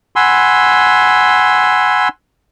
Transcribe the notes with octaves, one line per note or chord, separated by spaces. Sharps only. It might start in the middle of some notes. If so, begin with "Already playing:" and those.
F#5 G#5 B5 C6 E6